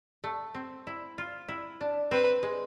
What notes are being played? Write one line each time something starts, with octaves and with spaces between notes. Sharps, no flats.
A3
C4
E4
F4
E4
D4
C4 B4
G#3